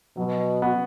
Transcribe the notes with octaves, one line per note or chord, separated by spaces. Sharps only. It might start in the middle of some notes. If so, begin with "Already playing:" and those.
B2 F#3
B3 F#4